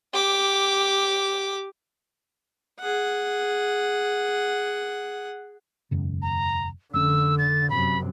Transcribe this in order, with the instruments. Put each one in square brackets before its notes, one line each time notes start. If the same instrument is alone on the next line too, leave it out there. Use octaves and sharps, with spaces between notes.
[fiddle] G4 D6
[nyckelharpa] G#4 F#5
[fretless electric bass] E1 F#2 C#3
[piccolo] A#5
[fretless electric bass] F1 C#4 [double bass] D3 [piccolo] E6
[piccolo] A6
[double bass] F#2 C3 [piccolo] B5